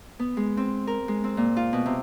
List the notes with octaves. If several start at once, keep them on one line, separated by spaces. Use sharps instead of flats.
B3
G#3
C4
A#4
G#3
C4
A#2
F4
B2
C3